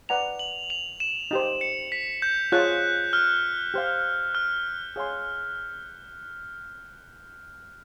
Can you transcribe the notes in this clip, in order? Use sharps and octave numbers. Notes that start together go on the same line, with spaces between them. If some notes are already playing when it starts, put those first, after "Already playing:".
B4 D5 F#5 A#5 F7
F#7
F7
E7
D#4 G4 C5
C#7
B6
G6
F4 G#4 C#5 F#6
F6
G4 C5 F5
F6
G#4 C#5 F5 G#5 C6